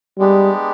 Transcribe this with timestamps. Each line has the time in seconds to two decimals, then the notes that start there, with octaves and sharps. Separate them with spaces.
0.19 G3 G#3 B3 D4 G4